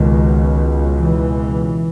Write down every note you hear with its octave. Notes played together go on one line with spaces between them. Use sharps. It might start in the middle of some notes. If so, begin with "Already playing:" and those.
Already playing: C#2 B2 D#3
E3